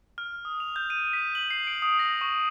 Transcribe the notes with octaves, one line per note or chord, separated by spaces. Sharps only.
F6
D#6
F7
G6
D#7
B6
F#7
C7
D7
D#6
A#6
C#6